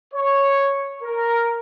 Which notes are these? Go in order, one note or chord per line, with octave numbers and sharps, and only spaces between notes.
C#5
A#4